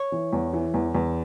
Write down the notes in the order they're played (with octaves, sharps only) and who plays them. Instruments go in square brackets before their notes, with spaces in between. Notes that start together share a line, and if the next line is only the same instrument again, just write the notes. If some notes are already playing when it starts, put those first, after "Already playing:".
Already playing: [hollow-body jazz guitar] C#5
[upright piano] E3
E2
E3
E2
E2